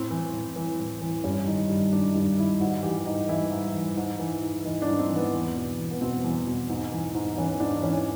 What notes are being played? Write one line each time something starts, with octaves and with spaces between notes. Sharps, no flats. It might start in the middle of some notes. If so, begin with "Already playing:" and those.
Already playing: A2 C4
E3
A2
E3
A2
E3
G2 C#4
D#3
G2
D#3 D4
G2 D#4
D#3 E4
G#2 F#4
E3 G4
G#2 D#4
E3 E4
G#2
E3
G#2
E3
G#2
E3 D#4
D4
G#2
C4
E3
B3
E2
B2
E2
B3
B2 C4
E2
B2
G#2
E3
G#2
E3 C#4
G#2 D4
E3 C#4